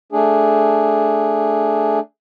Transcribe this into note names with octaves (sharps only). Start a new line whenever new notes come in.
A3 D4 G#4